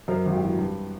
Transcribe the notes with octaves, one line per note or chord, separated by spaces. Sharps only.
F#2 A#4 C5
G#1
G4
E3
G2